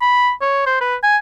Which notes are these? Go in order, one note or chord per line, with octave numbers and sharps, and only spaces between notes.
B5
C#5
C5
B4
G#5